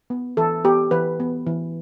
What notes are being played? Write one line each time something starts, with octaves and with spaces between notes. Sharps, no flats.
B3
E3 A4
B3 G4
E3 B4
B3
E3